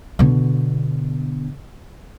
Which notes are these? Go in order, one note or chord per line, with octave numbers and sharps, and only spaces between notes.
B2 D3